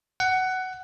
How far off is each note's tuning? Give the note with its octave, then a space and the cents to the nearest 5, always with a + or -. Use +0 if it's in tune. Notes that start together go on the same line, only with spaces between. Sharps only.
F#5 +15